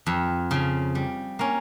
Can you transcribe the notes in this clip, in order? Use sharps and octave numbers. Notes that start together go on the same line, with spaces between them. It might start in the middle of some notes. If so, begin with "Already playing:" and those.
F2
C#3 F3
G3
A#3 C#4